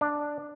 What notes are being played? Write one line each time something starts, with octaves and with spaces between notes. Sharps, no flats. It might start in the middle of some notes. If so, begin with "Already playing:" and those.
D4